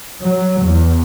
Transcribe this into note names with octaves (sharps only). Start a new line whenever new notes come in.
F#3
E2